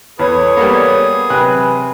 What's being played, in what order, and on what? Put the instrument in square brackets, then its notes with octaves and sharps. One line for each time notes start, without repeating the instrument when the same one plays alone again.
[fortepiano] E2 [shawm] G#4 [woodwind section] A4 C#5 [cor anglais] B4
[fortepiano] G3 A#3 [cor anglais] B3
[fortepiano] C3 F#6 [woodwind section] E3 F#3 G#5 [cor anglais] B4